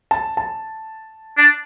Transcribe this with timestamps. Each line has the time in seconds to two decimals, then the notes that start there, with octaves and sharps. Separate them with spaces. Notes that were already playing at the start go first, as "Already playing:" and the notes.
0.11 A5
0.37 A5
1.38 D4